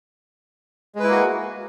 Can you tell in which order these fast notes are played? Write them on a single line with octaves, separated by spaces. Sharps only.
G#3 B4 E4 A#3 F#4